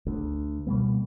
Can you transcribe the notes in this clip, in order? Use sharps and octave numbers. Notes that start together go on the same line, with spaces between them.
D2
B2 G3 A#3